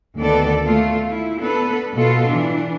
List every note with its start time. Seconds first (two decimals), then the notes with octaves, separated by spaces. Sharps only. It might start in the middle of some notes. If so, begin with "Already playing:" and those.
0.16 D2 D#3 B3 A4 D5
0.64 A3 F4
1.10 E4
1.39 B3 D4 A4 B4
1.93 B2 B3 F4 A4
2.25 E3 D4